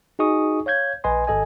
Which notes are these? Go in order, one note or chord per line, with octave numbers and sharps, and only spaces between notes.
D#4 F#4 G#4 D#5 C#6 D#6
C#5 F5 G6 G#6
A#1 B4 D#5 G#5 C6
G#1 A4 D#5 G#5